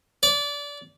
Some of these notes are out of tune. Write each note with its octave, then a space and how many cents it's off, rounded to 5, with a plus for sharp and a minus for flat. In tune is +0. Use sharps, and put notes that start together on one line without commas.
D5 -25